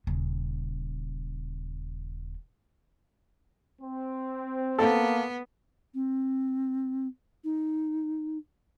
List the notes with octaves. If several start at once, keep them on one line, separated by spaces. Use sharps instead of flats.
D#1 C#3
C4
A#3 B3 A4
C4
D#4